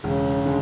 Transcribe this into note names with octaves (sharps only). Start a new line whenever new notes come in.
E1 C#3
D3 G#3